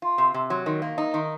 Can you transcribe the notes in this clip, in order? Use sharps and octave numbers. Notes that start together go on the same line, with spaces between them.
F4
C3
C3
F#3
D#3
A#3
D#4
D#3